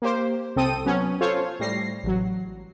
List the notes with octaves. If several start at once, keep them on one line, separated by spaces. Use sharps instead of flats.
A#3 G4 C5
C2 C4 A4 G5 D#6 D#7
F#3 B3 C#4
F4 A4 C5 C#5 F5
A2 G3 A#6 C7
A1 F#3